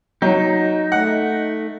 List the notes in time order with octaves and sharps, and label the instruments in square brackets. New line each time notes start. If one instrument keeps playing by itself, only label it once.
[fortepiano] F#3 [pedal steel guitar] D#4
[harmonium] A3 [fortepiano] F#5